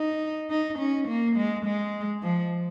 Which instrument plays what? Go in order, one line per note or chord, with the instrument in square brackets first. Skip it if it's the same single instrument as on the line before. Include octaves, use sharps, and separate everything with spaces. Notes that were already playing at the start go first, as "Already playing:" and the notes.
Already playing: [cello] D#4
D#4
C#4
A#3
G#3
G#3
F3